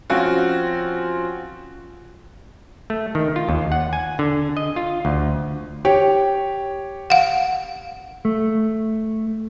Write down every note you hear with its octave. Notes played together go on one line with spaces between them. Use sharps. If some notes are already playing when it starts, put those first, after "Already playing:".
F3 C4 C#4 F4 F#4
A3
D#3
F4
D#2
F#5
G#5
D3
D#5
F4
D2
G4 C#5
F5 F#5
A3